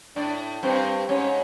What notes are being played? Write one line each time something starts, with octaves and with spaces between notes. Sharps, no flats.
A2 D4 D5
G2 C4 C5
G#2 C#4 C#5